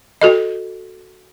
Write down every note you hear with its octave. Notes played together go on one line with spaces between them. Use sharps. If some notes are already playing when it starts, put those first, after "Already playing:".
F#4 A4 D#5